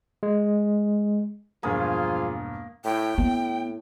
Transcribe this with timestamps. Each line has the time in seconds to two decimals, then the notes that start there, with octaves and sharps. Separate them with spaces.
0.23 G#3
1.63 E1 G2 F3 A#3 F4 G#4 D#6
2.85 A2 G5
3.18 A2 B3